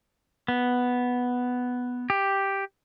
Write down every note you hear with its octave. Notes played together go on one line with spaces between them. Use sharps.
B3
G4